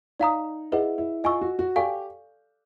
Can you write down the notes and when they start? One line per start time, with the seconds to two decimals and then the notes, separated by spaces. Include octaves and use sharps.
0.20 D#4 D5 F5 A#5 D#6
0.72 E4 G#4 B4 D#5 F#5
0.98 E4
1.24 F4 D#5 G#5 C#6 E6
1.41 F#4
1.59 F#4
1.76 G4 A4 D5 F5 G#5 C#6